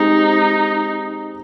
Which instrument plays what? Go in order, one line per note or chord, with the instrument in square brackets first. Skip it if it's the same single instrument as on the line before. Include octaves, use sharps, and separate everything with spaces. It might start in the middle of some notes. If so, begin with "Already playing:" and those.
Already playing: [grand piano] G#3 C4 G4 [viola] D#4